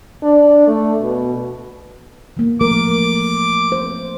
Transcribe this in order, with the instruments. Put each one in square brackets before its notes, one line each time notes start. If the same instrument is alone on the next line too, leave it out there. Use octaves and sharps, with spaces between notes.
[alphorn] D4
A3
B2
[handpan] E3 A#3
[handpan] F3 A3 A#4 [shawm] D6
[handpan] C5